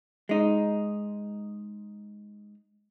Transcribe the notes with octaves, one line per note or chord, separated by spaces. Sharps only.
G#3 D#4